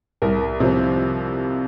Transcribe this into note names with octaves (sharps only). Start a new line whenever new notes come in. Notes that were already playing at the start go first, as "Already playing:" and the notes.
C2 A#4
C3 F3